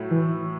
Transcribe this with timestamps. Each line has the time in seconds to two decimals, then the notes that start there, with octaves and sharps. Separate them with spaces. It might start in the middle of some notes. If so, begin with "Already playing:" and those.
Already playing: A2 F#3 A3 E4
0.11 E3